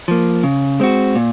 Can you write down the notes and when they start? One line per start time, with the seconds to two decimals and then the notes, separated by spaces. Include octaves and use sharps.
0.08 F3 A#3
0.44 C#3
0.80 G#3 C4 F#4
1.15 A#2